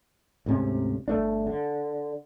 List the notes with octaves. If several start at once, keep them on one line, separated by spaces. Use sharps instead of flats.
D2 G#2 C3 C#4
G1 F2 A3 D4
D3